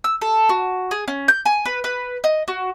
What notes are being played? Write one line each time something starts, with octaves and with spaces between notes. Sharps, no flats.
E6
A4
F#4
G#4
C#4
G6
G#5
B4
B4
D#5
F#4